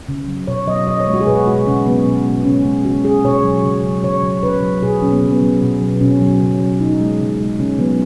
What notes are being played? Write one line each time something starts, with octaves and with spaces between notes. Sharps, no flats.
C#3
F#3
B2 C#5
F#3 D#5
B2 D#5
C#5
G#3
F#4
G#4
B2 B4
G#3 F#4
C#3 C#4
F#3 B3
B2
G#3
C#3 C#4
G#3
C#3 F#4
G#3 G#4
B2 C#5
F#3
C#3
F#3
C#3 C#5
F#3
C#3 B4
F#3
B2 G#4
F#3 C#4
B3
C#3
B3
F#3
B2
F#3
B2 C#4
F#3
C#3
F#3
B2 D#4
G#3
C#3
G#3
C#3 C#4
F#3 B3